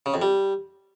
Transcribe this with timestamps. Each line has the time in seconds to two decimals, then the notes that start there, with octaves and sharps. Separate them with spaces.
0.06 C#3
0.14 F2
0.22 G3